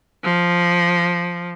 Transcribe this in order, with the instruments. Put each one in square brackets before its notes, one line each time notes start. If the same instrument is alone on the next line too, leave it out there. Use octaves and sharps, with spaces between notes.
[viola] F3